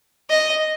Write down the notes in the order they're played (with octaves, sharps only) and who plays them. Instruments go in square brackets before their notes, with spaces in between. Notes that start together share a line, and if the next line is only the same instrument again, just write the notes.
[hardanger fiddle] D#5